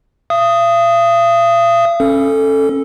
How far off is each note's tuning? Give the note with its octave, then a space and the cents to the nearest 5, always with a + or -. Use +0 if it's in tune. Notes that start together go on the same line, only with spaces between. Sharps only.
F5 -45 D#6 +0
C#4 -20 A4 +0